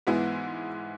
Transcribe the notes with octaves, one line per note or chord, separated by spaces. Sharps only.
G#2 E3 G#3 B3 E4